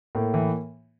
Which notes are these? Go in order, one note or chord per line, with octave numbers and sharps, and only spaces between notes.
A2 A#3
E3